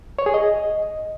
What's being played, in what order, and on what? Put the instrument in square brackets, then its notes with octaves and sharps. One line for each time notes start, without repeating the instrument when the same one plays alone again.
[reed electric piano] C#5
G#4
D#5